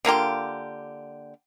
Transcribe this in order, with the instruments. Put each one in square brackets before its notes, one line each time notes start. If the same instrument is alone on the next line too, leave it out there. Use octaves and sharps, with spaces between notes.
[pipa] D3 A#3 F4 G4